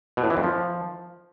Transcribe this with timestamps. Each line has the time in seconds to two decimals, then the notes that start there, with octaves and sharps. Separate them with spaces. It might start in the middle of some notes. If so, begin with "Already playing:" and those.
0.17 B2
0.24 A2
0.30 E3
0.37 F2
0.43 F3